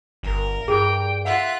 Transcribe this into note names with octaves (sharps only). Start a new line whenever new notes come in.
G1 A#4
G2 G#4 G5 D6
F4 E5 F#5 F#6